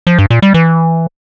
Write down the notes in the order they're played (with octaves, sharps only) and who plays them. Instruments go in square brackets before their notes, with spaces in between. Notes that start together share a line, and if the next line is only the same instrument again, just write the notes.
[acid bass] F3
G2
A#2
G3
E3